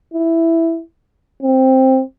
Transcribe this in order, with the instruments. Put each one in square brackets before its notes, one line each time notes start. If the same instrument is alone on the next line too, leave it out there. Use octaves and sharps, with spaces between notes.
[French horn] E4
C4